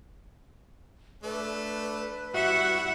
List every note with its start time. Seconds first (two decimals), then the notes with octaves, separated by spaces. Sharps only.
1.23 A3 D4 B4
2.34 G3 E4 F#4 E5 F#5